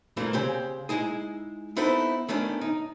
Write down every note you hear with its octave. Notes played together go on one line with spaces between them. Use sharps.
C2 A#2 E3 A3 A#3
C#3 C4 G4 G#4 C5
G#3 D#4 E4 G#4
B3 C4 D#4 E4 A4 B4
D#3 A3 B3 C#4 D4
D#4